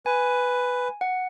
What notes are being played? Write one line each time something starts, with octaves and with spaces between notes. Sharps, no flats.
B4 G#5
F#5